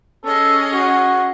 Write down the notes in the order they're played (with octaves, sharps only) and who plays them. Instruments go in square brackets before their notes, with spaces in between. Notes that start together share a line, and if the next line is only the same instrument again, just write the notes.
[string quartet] C#4 G#4 D#5 [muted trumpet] A4
[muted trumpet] F#4